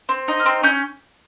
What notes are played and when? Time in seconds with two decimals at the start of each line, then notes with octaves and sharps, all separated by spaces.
0.09 C4
0.28 D#4
0.40 F6
0.46 C4
0.63 C#4 G6